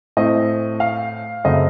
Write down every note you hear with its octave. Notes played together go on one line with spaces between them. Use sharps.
A2 A3 C4 D#5
F5
F#2 C#3 A3 C4 D#5